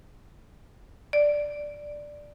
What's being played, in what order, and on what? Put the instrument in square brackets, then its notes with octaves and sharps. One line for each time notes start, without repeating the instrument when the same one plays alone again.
[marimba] D5